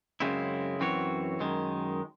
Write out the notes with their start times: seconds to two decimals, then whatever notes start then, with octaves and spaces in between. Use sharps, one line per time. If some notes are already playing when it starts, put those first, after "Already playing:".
0.20 F#2 C#3 G#3 C4 E4
0.80 F#2 E3 C4 F#4 C#5
1.40 F#2 D#3 G#3